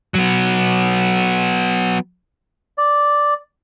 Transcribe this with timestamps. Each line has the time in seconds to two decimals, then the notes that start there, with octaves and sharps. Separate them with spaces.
0.14 F#3 B3
2.78 D5